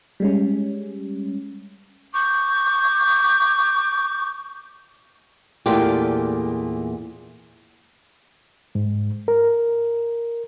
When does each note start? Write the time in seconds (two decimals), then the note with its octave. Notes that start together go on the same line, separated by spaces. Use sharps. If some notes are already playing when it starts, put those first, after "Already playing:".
0.20 G3 G#3 C#4
2.12 C#6 D6 G6
5.66 E2 A#2 A3 F4 G4
8.75 G#2
9.28 A#4